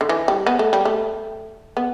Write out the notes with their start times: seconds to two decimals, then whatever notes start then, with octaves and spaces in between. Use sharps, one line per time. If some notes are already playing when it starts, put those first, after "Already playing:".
0.01 D3
0.09 E3
0.28 G3
0.47 B3
0.59 A3
0.73 G3
0.85 A3
1.77 B3